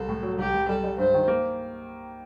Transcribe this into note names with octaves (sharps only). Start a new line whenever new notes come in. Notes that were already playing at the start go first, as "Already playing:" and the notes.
Already playing: C2 A4
A2
F#3
C2 G4
C2
G3 A4
G3
G2 C5
D#3
A#3